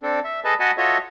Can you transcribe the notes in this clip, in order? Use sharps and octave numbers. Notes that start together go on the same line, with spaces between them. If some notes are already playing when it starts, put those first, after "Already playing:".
C4 D4 A4
E5
G#4 A4 B4 D#5 A5
F#4 D#5 F#5 G#5 A5 B5
F4 F#4 A4 C#5 D#5 E5